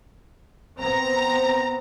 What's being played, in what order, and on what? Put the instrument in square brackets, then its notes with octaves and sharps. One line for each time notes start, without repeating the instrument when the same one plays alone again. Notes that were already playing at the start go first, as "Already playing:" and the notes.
[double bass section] B3 C4 [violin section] A#5